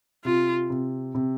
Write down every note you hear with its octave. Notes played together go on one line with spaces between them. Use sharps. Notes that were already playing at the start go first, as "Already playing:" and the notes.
C3 F4
C3
C3